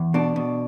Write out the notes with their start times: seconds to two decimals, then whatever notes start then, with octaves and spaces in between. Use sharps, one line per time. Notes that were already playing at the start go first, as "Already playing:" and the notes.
Already playing: E2
0.14 B2 D4
0.36 B2